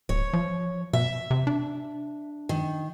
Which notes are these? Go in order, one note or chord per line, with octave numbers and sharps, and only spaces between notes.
D1 C#5
F3
B2 E5
C3
D4
D#3